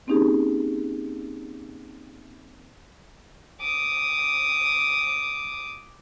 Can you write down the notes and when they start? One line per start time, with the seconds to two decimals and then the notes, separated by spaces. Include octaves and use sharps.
0.07 A#3 C4 C#4 D#4 G4 G#4
3.62 D6 D#6